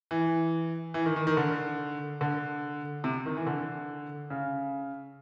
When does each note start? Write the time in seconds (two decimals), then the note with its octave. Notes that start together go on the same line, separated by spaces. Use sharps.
0.11 E3
0.94 E3
1.06 D#3
1.16 D#3
1.27 D#3
1.37 D3
2.21 D3
3.04 C3
3.26 D#3
3.37 E3
3.47 D3
4.30 C#3